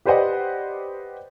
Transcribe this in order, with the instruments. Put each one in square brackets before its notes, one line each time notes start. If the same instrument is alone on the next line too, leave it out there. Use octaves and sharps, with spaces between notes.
[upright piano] G4 B4 C5 D5 D#5 F#5